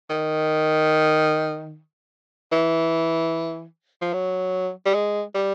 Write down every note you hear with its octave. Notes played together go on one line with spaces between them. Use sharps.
D#3
E3
F3
F#3
G3
G#3
G3